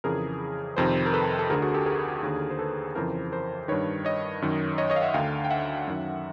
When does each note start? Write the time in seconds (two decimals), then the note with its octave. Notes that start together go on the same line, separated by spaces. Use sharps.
0.04 F2 C#3 E3 G#4 A#4
0.77 F2 C3 D#3 A#4 C5
1.06 A#4
1.13 A4 B4
1.39 A4
1.50 D2 D3 G#4 A#4
1.62 F#4 G#4
1.74 G4 A4
1.86 G#4 A#4
2.23 D#2 D3
2.50 C5
2.59 A4 B4
2.95 F2 C#3 E3 A#4 C5
3.32 A#4 C5
3.68 G2 D#3 B4 C#5
4.05 C#5 D#5
4.42 F#2 D#3
4.78 C#5 D#5
4.90 C#5 D#5
4.96 F5
5.02 E5 F#5
5.14 D2 D3 F5 G5
5.45 G5
5.50 E5 F#5
5.87 F#2 D#3